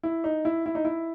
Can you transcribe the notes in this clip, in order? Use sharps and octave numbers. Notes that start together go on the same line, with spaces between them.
E4
D#4
E4
E4
D#4
E4